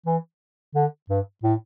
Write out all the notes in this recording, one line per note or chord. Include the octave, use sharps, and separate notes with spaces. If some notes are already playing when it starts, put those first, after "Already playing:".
E3
D3
G2
A2